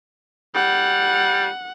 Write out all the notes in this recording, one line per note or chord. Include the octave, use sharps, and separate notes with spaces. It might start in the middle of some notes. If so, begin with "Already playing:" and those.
G3 F#5